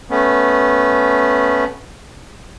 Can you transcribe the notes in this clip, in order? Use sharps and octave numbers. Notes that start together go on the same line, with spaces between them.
A3 B3 C#4